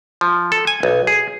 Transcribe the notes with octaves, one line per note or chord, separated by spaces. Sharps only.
F3
A4
G#5
B1
G#4